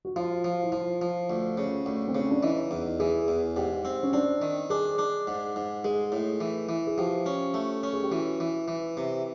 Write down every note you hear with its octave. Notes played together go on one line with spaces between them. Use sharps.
F#4
F3 F4
F3
E4
F3 F4
F3
D2
C#3
D2
C4
C#3 C#4
D4
E3 D#4
E2
E3 G#4
E2
G#2 G4
C4
C#4
C4 D4
D#3
D4 G#4
D4
G#2
G#2
G#3 G#4
A2
E3
E3
G#4
F3 G4
C#4
A3
C#4
G#4
G4
E3 F#4
E3
E3
C3